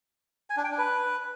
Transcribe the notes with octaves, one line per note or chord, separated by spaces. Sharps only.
G#5
D4
G5
D4
B4